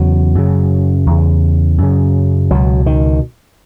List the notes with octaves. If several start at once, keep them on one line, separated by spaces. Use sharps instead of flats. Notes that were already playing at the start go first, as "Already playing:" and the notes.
Already playing: E2 C#3 F#3
F#2 C#3
E2 C#3
F#2 C#3
C#2 B2 F#3
D#3